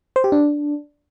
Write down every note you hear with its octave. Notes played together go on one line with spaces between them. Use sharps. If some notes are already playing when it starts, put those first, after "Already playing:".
C5
G4
D4